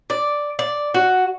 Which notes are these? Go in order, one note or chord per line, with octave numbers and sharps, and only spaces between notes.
D5
D5
F#4